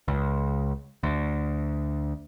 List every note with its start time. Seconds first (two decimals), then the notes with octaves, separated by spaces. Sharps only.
0.08 C#2
1.03 D2